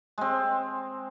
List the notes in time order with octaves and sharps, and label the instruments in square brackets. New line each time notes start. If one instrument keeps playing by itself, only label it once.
[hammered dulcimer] G#3 C4